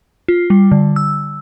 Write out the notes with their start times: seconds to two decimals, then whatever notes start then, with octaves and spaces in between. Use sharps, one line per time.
0.28 F4
0.50 G3
0.72 D3
0.96 E6